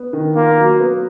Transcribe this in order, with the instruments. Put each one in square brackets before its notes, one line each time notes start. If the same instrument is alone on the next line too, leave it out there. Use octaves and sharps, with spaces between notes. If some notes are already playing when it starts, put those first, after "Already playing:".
Already playing: [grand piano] B3
D#3
[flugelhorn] A#3 [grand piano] F4
[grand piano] F#3
B3